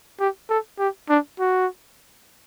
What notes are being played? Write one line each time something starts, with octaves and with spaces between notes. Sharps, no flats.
G4
A4
G4
D4
F#4